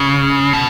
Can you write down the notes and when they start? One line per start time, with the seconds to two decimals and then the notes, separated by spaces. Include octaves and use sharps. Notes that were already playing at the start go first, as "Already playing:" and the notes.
Already playing: C#3
0.53 B2